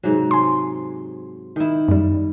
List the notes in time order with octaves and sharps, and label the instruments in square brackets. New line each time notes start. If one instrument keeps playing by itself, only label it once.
[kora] G#2 C3 F#3
[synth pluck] G#5 C6
[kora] D#3 E4
[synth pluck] F#2 G3